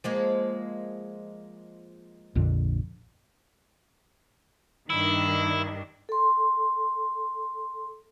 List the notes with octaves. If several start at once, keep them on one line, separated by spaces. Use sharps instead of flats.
F3 G#3 A#3
A#1 F2 D3
G2 D#3 D4 E4
A4 C6